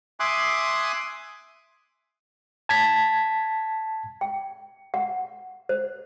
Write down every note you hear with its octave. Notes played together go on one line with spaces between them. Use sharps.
E5 G#5 C6 D6 D#6 F#6
A5 G#6 B6
G5
F#5
C5